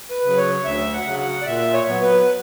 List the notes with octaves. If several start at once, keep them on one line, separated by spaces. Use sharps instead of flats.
B4
C#3 F#3
C#5
D2 E5
F#5
C#3 F#3
F#5
D5
A#2 E5
C#5
F#3 B3
B4